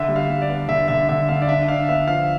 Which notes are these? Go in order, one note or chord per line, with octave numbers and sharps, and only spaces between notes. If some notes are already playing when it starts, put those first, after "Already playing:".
Already playing: D3 E5
G3
F5
G3
D5
B3
D3 E5
D3 E5
D3 E5
D3 F5
D5
D4 E5
D4 F5
B3 E5
F3 F5